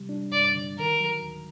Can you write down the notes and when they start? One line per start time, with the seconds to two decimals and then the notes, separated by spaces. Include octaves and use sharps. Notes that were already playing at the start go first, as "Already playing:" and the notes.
Already playing: C3 G3
0.09 D4
0.32 G2 D5
0.55 D3
0.78 D#3 A#4
1.00 F#3
1.22 D2